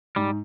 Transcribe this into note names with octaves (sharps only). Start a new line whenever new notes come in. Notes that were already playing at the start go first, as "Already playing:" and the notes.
G#2 G3